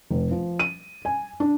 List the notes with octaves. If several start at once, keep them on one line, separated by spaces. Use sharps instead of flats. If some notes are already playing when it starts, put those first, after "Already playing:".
F1
F3
D#7
G#5
D4